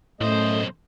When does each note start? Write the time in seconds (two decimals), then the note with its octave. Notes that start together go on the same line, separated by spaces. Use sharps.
0.21 B1 F#2 A2 A3 C5 D#5